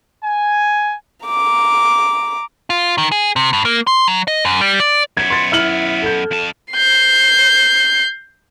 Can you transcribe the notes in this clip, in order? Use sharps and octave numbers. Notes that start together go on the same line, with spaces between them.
G#5
A#5 D6
F4
D#3
G#4
C3
G2
A#3
C6
F#3
D#5
F#2
G3
D5
F#2 B3 G#6
C6 A6
E4 F6 F#7
A4 G6
F2 A5
G6 C7